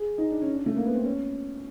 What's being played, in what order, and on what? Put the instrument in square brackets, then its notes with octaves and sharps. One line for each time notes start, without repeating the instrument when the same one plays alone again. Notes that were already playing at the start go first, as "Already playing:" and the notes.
Already playing: [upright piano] G#4
D#4
D4
C#4
D4
A3
A#3
B3
C4
C#4